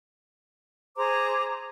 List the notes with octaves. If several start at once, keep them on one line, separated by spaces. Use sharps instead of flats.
G#4 C5 A#5 D6